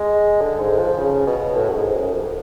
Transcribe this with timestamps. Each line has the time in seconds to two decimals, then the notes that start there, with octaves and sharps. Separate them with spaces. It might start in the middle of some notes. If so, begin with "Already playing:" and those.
Already playing: G#3
0.41 D3
0.60 G#2
0.79 F3
0.99 C#3
1.27 B2
1.56 A2
1.69 F#2
1.75 G#2
1.94 F#2
2.13 F2